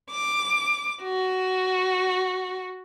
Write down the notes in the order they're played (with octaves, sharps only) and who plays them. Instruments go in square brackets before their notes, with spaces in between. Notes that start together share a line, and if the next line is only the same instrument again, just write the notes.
[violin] D6
F#4